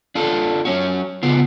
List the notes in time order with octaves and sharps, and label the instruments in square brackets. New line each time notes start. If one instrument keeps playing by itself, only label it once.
[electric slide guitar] D4 F4 A4
F#3 C#4 F#4
C#3 B3 F4